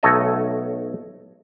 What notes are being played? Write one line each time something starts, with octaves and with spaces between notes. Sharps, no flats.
B1 A3 A4 C#5 D#5 A5